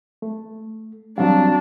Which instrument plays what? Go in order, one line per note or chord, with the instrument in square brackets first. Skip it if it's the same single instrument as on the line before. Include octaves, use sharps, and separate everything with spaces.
[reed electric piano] A3
[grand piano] F#3 F5 [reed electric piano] G3 C4 [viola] D4